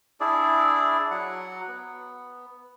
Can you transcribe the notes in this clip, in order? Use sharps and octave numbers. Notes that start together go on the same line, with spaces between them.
D4 E4 G#4 D5
F#3 F#5
B3